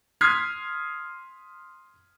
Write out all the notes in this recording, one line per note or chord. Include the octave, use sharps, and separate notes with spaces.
C6 D#6 F6 G#6 B6 C7